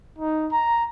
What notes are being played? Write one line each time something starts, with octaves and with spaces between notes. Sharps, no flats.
D#4
A#5